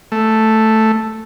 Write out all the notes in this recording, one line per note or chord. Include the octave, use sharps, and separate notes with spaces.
A3